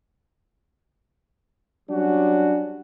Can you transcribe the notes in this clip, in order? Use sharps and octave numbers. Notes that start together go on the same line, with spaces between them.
F#3 G3 C#4 D4 F#4